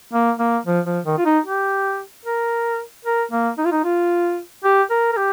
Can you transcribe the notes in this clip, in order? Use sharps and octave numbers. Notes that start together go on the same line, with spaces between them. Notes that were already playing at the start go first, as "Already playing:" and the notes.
A#3
A#3
F3
F3
D#3
F4
D#4
G4
A#4
A#4
A#3
D#4
F4
D#4
F4
G4
A#4
A#4
G4